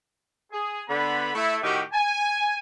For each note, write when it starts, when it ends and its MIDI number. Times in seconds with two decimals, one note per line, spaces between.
0.52 0.82 68
0.88 1.31 50
0.88 1.31 59
0.88 1.31 83
1.33 1.56 57
1.33 1.56 64
1.63 1.82 45
1.63 1.82 51
1.63 1.82 66
1.63 1.82 67
1.93 2.56 80